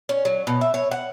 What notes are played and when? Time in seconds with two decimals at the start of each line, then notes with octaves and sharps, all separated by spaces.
0.09 C#4
0.25 F#3
0.47 B2
0.61 E5
0.74 C#5
0.91 F#5